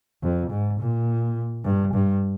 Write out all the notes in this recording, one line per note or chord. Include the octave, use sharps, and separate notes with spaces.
F2
G#2
A#2
G2
G2